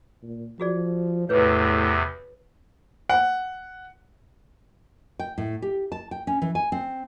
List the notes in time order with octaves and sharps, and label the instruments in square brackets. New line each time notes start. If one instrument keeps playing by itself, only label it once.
[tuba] A#2
[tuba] F3 [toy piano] F#4 G#4 D5
[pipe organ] E2 C3 [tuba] A2 [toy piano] G#4 B4 C#5
[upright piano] F#5
[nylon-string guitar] G5
A2
G4
A5
G5
C#4
E3
G#5
C4